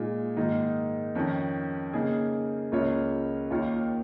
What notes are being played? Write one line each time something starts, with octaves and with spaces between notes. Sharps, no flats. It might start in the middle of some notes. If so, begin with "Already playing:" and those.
Already playing: A#2 G#3 D#4 G#4
G#2 D#3 A#3 D#4
F2 D#3 C#4
C#3 A#3 D#4 G#4
C#2 C#3 A#3 F4 C#5
D#2 D#3 A#3 F4 C#5